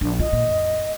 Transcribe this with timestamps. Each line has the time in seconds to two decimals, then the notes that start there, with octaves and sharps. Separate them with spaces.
0.01 A#1 D4
0.20 F4 D#5
0.33 A#2
0.46 F#1